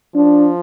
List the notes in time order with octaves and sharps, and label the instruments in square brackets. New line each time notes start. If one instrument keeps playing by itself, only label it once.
[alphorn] F3 [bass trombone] D4